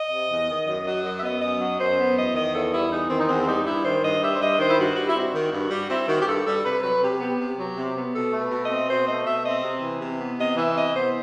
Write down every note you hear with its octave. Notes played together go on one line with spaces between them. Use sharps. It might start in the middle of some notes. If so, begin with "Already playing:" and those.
Already playing: D#5
C3
E2
D#3
F#2 D#5
F#3 D#5
F#2 D#5
E5
B3 D#5
F#2 D#5
F#3
F#2 C5
B3
E2 D#5
D#3 D#5
E2 A4
G3 E4
E2 D#4
D#3 C4
D#4
E2 C4
C4
G3 D#4
G2 E4
D#3 C5
G2 D#5
G3 E5
C5
G2 D#5
D#3 C5
E4
G2 F#4
G3 F#4
E4
C4 F#4
D#3
G2
G3
C4 E4
D#3 F#4
G4
G2 A4
G3 A4
C3 B4
F#3 B4
C3 G4
B3 G4
C3 G4
F#3
C3
B3
B2 A4
A3
B4
B2
D#5
C4
B2 C5
A3 D#5
B2 E5
C4 D#5
C3
E3
C3
B3
C3 D#5
E3 E5
C3 D#5
B3 C5